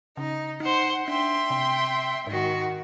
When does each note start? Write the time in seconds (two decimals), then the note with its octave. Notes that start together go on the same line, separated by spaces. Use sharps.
0.17 C#3 D#4
0.60 D#4 C5 F#5
1.08 D4 E5 G5 C6
1.50 C3
2.27 G#2 D#3 F#4